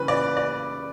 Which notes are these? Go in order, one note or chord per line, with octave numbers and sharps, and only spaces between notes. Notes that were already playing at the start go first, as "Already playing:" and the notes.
Already playing: C#3 E3 G3 B4
D5
D5